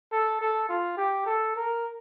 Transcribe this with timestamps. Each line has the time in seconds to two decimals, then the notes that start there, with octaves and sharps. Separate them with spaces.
0.12 A4
0.41 A4
0.69 F4
0.97 G4
1.26 A4
1.56 A#4